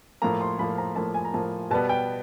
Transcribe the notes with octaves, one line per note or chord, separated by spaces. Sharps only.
A2 F3 A#3 A#5
C6
A2 F3 A#3 B5
A#5
A2 F3 A#3 A5
G#5
A#5
A2 F3 A#3 A5
B2 G3 B3 A5
G5